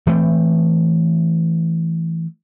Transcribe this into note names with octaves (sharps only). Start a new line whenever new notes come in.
E3 A3 C4